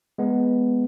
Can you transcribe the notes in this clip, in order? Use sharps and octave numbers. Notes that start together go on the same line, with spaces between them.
G#3 B3